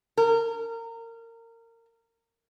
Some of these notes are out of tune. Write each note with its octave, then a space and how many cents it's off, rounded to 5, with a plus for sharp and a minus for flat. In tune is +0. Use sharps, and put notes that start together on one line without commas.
A#4 -25